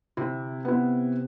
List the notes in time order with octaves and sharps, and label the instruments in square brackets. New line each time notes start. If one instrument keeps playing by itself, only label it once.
[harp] C3 [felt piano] E4
[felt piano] B3 E4